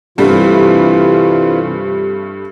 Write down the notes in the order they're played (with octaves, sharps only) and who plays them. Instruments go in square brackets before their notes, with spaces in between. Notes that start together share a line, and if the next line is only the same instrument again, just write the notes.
[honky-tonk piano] G2 G3 A3 [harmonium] C3 E3 F4